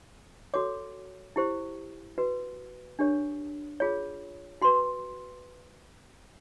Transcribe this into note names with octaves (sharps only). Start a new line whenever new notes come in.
F#4 A4 C#5 D6
E4 G4 C5
F#4 B4
D4 G4 A#4 C#5
F4 G#4 C#5
F#4 B4 C6